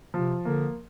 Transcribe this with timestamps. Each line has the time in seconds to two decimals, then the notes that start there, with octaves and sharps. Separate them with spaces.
0.14 C3 F3
0.45 D3 A#3